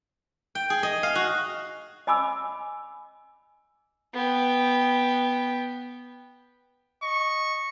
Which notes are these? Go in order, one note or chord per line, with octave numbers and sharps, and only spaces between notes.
G5
G#4
D#5
F5
F#4
D#5 G#5 B5 D6 E6
B3 G5
D#5 C#6